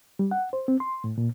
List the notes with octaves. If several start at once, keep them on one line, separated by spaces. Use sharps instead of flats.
G3
F#5
C5
C4
C6
A2
A#2